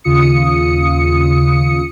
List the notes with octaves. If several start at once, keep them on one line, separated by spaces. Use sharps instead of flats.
D#2 C#3 F4 D#6 C#7